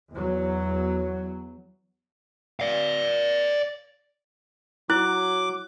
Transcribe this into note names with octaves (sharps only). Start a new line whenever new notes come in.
E2 F#3
D5 F5
F#3 E4 D6 F#6